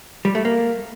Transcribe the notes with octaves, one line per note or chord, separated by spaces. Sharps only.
G3
A3
A#3